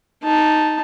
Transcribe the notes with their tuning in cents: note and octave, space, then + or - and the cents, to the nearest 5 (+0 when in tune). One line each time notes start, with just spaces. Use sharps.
D#4 +0 A5 +0